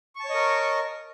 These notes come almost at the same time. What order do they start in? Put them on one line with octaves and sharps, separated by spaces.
C#6 A5 C#5 D#5 A#4